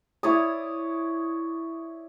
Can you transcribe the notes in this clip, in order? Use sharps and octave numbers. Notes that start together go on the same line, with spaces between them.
E4 C#5 D5 D#6